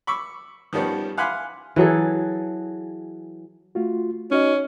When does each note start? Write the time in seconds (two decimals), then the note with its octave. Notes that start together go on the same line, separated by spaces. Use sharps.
0.07 B5 C#6 D6 E6
0.73 D#3 F3 G3 B3 C#4
1.17 F5 F#5 G#5 B5 C6 D6
1.76 E3 F#3 G#4 A4
3.75 A3 F4 F#4
4.31 C#4 D#4 F#4 D#5